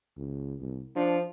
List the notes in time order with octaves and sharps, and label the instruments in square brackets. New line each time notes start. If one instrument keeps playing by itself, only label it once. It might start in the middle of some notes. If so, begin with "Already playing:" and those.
[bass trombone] C#2
C2
[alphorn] F3 [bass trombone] D4